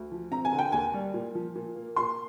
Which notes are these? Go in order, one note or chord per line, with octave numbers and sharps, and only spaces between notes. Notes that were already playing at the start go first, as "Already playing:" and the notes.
Already playing: D2
F3
C4 A#5
G#5
D3
G5
D#2 G#5
G3
A#2
F3
A#2
A#3
A#2 C6